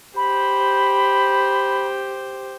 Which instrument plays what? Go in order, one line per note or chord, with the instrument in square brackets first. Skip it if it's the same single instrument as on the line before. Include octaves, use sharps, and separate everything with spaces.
[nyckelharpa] G4 C5 [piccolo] B5